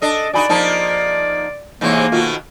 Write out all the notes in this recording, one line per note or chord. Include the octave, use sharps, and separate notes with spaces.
D4 A4 D#5
D4 D#4 F#4 G#4 D5 G#5 B5
F3 A#3 D#4 G#4 A5
G#2 C3 E3 A#3 D#4 C#5
B2 D#3 A3 F4 F#4